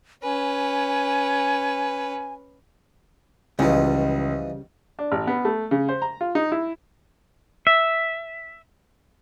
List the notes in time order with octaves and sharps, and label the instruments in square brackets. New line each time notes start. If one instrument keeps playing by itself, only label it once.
[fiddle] C#4 B4 [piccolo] G#5
[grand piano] C#2 [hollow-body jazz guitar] C#3 G3 [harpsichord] E3 F3 D#4
[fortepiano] D4
A1
B3
A3
C#3
C5
A#5
F4
D#4
E4
[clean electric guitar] E5